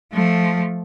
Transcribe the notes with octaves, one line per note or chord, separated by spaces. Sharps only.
F3 A3